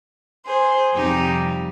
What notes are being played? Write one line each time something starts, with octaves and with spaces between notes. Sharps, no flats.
G#4 C5
F2 C3 G3 D#4 G4